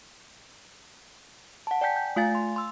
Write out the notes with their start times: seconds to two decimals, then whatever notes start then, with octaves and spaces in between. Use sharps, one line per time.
1.67 F#5 A5
1.81 D5 G5 G#5 G6 B6
1.96 G6
2.16 A3 F4 F5 G#5 A6
2.35 C6
2.56 C6 E6